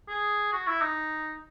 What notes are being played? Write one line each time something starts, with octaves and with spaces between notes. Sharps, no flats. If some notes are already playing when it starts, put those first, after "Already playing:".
G#4
F#4
E4
D#4